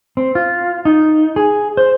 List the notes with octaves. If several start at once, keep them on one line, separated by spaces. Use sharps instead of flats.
C4
F4
D#4
G#4
C5